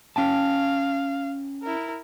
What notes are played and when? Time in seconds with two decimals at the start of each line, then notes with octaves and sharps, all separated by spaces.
0.16 C#4 F5 G5 A5
1.62 E4 A#4